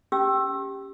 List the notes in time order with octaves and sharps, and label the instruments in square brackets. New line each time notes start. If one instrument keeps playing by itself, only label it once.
[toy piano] C#4 G4 E6